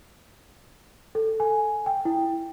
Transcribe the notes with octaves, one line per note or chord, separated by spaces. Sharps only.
A4
G#5
G5
E4